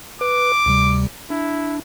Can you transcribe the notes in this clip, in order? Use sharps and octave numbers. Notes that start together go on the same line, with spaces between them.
B4 D6
D2 C3 G3
D4 E4